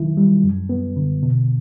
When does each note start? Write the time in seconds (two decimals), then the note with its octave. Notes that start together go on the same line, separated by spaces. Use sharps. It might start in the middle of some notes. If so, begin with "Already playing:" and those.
Already playing: D#3 F#3 E4
0.17 G3
0.44 F#2
0.69 B3
0.96 D3
1.23 B2